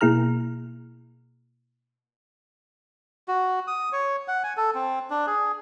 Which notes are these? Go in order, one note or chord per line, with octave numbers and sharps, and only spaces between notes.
B2 A#3 E4 G#4 A#5 F6
F#4
D#6
C#5
F#5
G#5
A4
C4
D4
G#4